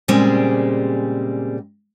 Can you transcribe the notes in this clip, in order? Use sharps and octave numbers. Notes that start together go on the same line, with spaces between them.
A#2 C#3 G3 G#3 C4